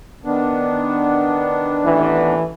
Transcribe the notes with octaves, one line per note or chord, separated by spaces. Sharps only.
D#3 B3 D4
A1 E3